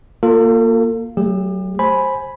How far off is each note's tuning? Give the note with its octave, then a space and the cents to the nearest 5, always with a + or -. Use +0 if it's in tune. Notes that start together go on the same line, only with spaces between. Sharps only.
A#3 +0 F4 +10 A4 +40
F#3 +20 A3 +0 G4 +35
C5 +15 G#5 +10 B5 +0